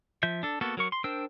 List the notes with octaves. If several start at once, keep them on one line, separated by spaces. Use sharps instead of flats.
F3 E5 G6
D4 A4
A#3 B3 F#4 A4
F#3 A#4 C#6
C6
D4 A#4 C5 G5 E6